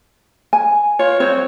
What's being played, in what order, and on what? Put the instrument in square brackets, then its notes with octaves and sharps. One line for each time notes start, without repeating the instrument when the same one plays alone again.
[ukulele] G#5
[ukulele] F4 [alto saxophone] C#5
[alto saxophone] C4 [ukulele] C#5